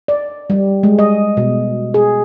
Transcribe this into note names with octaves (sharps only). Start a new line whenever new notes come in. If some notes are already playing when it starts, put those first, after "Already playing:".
D5
G3
G#3
D#5
B2
G#4